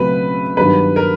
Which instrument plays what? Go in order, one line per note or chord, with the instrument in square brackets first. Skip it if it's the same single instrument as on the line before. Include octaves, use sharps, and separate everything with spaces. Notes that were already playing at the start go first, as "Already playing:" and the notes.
Already playing: [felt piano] C#2 B2 F#3 A3 C4 [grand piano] B4
[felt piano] G2 D#3 F#3 B3 [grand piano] B4
[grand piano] A#4